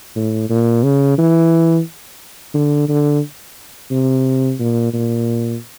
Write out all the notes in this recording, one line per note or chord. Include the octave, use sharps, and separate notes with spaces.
A2
A#2
C#3
E3
D3
D3
C3
A#2
A#2